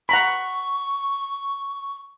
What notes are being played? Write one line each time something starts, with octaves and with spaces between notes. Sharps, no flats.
F#5 A#5 B5 C#6